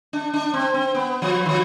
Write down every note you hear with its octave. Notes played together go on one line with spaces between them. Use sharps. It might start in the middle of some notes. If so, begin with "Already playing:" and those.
D4
D4
C4
C4
B3
F3
D#3
F3